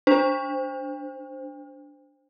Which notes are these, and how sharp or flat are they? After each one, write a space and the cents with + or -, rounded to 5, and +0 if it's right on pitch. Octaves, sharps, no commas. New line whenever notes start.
D4 +0 C5 +0